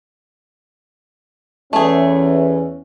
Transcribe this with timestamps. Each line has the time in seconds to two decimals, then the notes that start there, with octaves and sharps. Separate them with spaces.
1.73 E2 A3 C#4 G#4